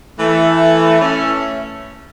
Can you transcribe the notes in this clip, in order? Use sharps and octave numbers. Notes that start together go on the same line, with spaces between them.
E3 A3
A3 C#4